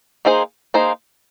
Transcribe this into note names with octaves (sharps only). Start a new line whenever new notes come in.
A#3 D#4 G#4 C5
A#3 D#4 G#4 C5